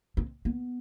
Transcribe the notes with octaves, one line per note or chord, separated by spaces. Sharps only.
C4
B3